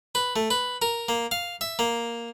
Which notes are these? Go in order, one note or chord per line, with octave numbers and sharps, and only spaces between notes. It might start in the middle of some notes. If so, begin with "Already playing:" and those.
B4
A3
B4
A#4
A#3
F5
E5
A#3